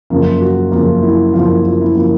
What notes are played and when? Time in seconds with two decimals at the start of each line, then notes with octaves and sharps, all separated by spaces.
0.10 F#2 C#3 F3 A#3 F4
0.41 F#4
0.72 F#2 C#3 F3 A#3 F4
1.03 E4
1.34 F#2 C#3 F3 A#3 F4
1.49 F4
1.65 F4
1.80 E4
1.95 C#3 F3 A#3 F4